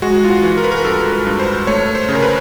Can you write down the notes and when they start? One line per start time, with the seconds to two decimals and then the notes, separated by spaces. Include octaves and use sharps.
0.02 G#3 F#4
0.24 F4
0.30 F#4
0.43 E3
0.57 A#4
0.64 B4
0.72 A#4
0.84 G2 A4
1.12 B4
1.26 G2
1.39 C5
1.67 A3 C#5
1.95 C5
2.09 C#3
2.15 A#4
2.23 B4